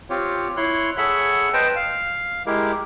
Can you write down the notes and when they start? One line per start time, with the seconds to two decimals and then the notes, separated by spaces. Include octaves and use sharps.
0.10 C4 F4 G4 C#5
0.57 E4 C#5 C6 F#6
0.98 G#4 A4 C#5 E5 F#5 B5
1.53 B4 C5 D#5 G5 A5
1.76 F5
2.46 G#3 E4 G4 A#4